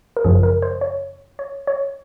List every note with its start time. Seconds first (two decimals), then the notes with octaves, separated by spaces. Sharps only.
0.17 A#4
0.24 G#1 F#2 C#3 F3 G#4
0.43 A#4
0.62 C5
0.81 C#5
1.39 C#5
1.67 C#5